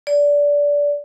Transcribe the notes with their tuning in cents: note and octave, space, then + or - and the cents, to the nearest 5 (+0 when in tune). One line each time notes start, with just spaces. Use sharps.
D5 -20